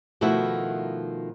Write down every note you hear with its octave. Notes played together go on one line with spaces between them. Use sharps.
B2 D#3 F3 A3 E4 F#4